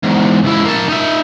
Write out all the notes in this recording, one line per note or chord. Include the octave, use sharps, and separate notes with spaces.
E2 G#2
C#2 E4
A#3 A5
D#4 E5